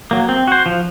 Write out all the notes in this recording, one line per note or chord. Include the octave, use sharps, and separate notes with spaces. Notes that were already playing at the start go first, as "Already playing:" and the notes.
F#3 A#3
C4
F#4 C5
F3